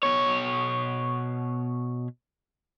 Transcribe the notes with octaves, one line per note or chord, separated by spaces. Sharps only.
B2 C#5